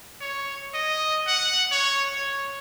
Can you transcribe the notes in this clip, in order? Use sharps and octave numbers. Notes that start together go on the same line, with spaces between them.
C#5
D#5
F#5
C#5
C#5